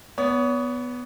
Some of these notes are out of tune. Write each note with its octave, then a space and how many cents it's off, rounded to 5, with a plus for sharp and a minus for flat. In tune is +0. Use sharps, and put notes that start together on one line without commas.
B3 +0 C#5 +40